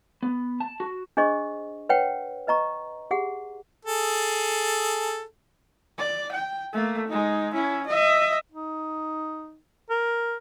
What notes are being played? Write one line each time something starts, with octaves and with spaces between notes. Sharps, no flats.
B3
A5
F#4
D4 G#4 C5 D#5 C#6
B4 C#5 F#5 G5
B4 D#5 A#5 C#6
G4 G#4 F#5
G#4 A4
D5
G5
A3 A#3
G#3 D#4
C#4 E4
D#5 E5
D#4
A#4